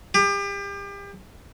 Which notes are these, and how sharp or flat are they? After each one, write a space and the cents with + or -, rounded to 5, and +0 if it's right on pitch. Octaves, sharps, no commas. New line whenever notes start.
G4 +35